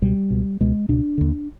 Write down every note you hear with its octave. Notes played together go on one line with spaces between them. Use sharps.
C#2 B2 G3
C#2 B2
C#2 B2 G#3
C#2 B2 D4
D#2 D3